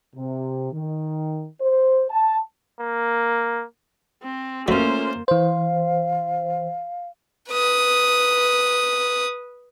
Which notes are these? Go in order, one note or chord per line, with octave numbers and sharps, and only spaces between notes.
C3
D#3
C5
A5
A#3
C4
F#3 A3 A#3 C#4 F4 C5
E3 C5 F5
B4 D#6